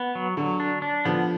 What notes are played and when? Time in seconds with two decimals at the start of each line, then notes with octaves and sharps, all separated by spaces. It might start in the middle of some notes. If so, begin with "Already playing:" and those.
Already playing: B3
0.15 F#3
0.37 D3 F#3
0.60 D4
0.82 D4
1.05 D3 F3 B3